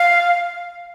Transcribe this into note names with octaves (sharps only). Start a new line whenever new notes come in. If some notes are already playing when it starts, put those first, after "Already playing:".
Already playing: F5